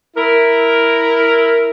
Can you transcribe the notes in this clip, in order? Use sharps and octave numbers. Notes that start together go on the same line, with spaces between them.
E4 A#4